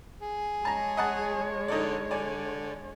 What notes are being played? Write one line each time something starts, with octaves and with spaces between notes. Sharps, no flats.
G#4
G#3 C#5 A5 A#5
D#5 F#5 A5
D3 D#4 A4 D5
D3 D5 G#5